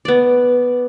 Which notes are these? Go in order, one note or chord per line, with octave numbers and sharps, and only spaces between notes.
B3 D5